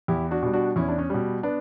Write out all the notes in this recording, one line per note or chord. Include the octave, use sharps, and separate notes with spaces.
E2 E4 G4
D4 F#4
B2 G3
D4 F#4
E2 C#4 E4
D4
C#4
B2 G3
B3 D4